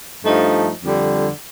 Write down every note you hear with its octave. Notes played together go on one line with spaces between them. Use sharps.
G2 F3 A3 D#4
F2 D3 G3